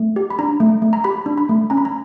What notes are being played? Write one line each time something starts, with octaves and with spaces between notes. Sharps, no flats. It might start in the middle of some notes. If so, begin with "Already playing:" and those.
Already playing: A3
G4
B5
D4 A#5
A3
A3
A#5
G4 B5
D4
B5
A3
C#4 A#5
B5
A#5